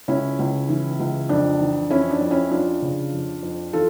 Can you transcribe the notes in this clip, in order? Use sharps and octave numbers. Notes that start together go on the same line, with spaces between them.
C#2 C#4 E4
C#2
E3
C#2
F2 D4
E3
F2 C#4 E4
D4
F2
C#4 E4
F2 D4 F4
C#3
F2
F2
E3 F4 A4